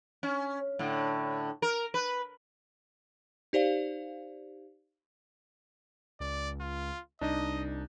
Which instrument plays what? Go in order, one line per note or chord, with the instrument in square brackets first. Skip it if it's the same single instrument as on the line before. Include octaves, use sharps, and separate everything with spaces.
[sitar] C#4
A2 D3
A#4
B4
[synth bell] D#4 G4 C5 D5 F5
[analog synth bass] C#2 [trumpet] D5
[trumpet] F4
[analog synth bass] C2 [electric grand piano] D4 D#4 [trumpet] D#5